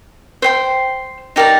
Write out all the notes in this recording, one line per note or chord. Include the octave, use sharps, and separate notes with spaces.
C5 G5 C6
D#4 G4 A#4 D5